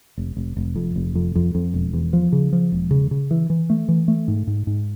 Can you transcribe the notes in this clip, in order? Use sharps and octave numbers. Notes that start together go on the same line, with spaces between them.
F1
F1
F1
F2
F1
F2
F2
F2
E1
E2
F3
C#3
F3
E1
C#3
C#3
E3
E3
A3
E3
A3
G#2
G#2
G#2